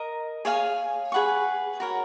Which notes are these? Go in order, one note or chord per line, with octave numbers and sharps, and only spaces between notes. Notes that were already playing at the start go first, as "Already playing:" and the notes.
Already playing: A#4 D#5 A#5
G#4 C#5 F5 G#5
G#4 B4 F#5 C#6
F#4 A#4 C#5